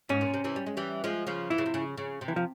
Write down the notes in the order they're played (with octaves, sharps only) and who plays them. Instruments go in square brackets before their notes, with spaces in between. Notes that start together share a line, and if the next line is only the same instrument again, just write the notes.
[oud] G#2 [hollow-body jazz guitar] C#4
[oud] A#2
C3
C3 E3
G3
G#3
E3 G3
F3 G#3
C#3 F3
[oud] E3 [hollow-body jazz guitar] E4
[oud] C#3
C3
C#3
C#3
C3
[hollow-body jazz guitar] E3
F3